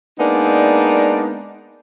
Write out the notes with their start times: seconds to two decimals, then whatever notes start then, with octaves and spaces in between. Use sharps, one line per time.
0.19 G#3 A#3 B3 D4 D#4 D5